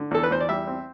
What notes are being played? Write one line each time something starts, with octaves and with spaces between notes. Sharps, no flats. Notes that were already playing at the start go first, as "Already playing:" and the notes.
Already playing: D3
E2 A4
B4
E2 C5
D5
G3 E5
C4